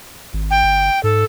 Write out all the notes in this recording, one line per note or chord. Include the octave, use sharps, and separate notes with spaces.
G#1
G5
G1
G#2 A4